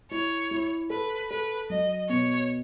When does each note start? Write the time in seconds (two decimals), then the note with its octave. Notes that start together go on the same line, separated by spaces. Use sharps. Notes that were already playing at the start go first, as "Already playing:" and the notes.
0.11 E4 C#5
0.51 E4
0.90 A4 B4
1.30 A4 B4
1.70 F#3 D#5
2.09 B2 C#5